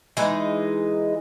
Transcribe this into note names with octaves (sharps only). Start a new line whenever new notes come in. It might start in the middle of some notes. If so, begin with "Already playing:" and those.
E3 G#3 D#4